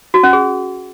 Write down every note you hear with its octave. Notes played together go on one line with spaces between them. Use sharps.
F#4
C#4
G#4